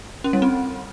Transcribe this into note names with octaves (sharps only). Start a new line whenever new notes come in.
C#4
G3
C4